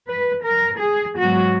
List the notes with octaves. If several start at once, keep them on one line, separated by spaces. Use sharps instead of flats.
B4
A#4
G#4
G#2 F#3 B3 F#4